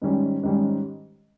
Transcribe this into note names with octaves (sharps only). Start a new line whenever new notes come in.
G#2 D#3 G3 C#4
G#2 D#3 G3 C#4